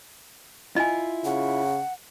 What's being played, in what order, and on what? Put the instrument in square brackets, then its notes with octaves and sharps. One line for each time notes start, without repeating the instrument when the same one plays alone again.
[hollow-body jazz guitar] E4 F4 [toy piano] D#5 G#5
[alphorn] C#3 [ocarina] F#5